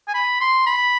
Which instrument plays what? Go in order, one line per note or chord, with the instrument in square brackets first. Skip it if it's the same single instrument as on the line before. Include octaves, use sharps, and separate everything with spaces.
[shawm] G#5
B5
C6
B5